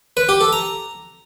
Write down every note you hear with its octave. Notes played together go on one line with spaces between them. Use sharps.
B4
G4
A4
A#5